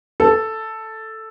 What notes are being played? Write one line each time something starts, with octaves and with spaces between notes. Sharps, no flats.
A4